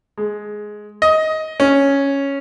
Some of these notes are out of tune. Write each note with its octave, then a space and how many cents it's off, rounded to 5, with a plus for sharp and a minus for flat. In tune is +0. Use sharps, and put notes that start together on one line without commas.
G#3 +10
D#5 +15
C#4 +0